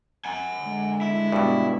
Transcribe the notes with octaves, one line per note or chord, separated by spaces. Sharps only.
F#5 G#5
D3 G#3
E4
G2 B2